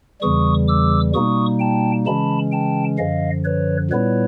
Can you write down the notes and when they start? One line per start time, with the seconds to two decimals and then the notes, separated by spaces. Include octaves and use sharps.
0.21 E2 C#3 E3 G3 C#6 D#6
0.68 D6 E6
1.14 B2 G3 A#3 D#4 C#6 D#6
1.60 G5 A5
2.06 C#3 E3 G#3 C#4 A5 B5
2.52 G5 A5
2.98 F#2 D3 F3 D#5 F5
3.44 B4 C#5
3.90 A#2 G3 B3 E4 B4 C#5